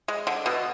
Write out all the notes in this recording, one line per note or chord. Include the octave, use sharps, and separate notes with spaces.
G#3
D3
B2